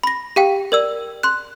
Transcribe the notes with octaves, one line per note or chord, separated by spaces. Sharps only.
B5 A#6
G4 F5 G5
A#4 D5 E6
C6 F#6